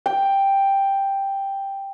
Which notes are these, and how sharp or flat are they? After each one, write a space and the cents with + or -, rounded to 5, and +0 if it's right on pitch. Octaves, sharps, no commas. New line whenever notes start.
G5 +5